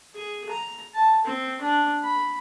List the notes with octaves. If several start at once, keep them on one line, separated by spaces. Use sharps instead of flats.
G#4
A#5
A5
C4
D4
B5